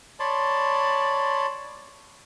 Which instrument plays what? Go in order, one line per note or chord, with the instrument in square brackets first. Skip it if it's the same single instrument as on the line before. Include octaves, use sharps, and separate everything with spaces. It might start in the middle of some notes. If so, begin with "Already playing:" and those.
[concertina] C#5 D5 A5 B5 C6